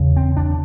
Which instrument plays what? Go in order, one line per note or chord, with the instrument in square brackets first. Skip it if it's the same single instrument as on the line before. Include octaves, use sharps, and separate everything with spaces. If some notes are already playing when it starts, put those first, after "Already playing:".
Already playing: [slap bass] E2 C#3
C4
D4